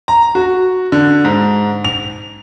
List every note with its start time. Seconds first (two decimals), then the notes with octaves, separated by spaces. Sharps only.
0.08 A#5
0.35 F#4
0.92 D3
1.25 G#2
1.85 F7